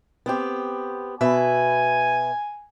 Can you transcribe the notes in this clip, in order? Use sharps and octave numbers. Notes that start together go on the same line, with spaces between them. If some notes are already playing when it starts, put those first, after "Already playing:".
B3 C4 G4
B2 B4 E5 G#5